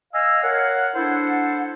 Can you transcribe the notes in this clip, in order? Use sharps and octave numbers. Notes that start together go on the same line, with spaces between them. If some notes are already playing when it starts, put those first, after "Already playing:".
D#5 F5 G#5 E6
A#4 C#5 F5 F#5
D4 E4 A4 C5 F#5